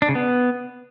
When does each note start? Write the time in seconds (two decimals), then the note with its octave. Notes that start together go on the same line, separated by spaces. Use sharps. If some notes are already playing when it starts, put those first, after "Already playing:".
0.02 D4
0.09 C#3
0.15 B3